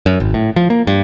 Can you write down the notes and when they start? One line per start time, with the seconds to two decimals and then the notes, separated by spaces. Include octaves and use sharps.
0.06 F#2
0.20 G#1
0.34 A2
0.56 F3
0.70 A#3
0.87 G2